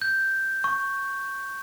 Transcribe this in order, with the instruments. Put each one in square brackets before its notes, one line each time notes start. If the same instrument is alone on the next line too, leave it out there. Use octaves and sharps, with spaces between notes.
[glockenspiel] G6
C#6